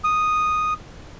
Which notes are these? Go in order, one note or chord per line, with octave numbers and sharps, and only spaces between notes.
D#6